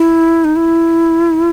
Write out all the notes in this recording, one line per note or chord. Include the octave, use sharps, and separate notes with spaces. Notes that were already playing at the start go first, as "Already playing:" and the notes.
Already playing: E4
D#4
E4